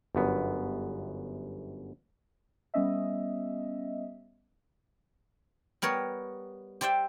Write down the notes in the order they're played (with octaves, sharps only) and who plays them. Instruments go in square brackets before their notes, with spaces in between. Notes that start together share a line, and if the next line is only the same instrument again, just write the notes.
[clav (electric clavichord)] G1 F#2 B3
[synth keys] G3 B3 C#4 D#5 E5
[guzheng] G3 B3 A#4 C#5
G4 C5 D5 E5 G5